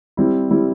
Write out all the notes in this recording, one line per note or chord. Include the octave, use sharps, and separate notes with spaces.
G3 C4 E4
G3 C4 E4